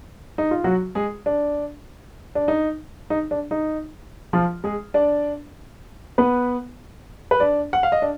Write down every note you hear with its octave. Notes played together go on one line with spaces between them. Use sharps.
D#4
F4
F#3 F#4
G#3 G#4
D4
D4
D#4
D#4
D4
D#4
F3 F4
G#3 G#4
D4 D5
B3 B4
B4
D4 D5
F#5
F5
D#5
D4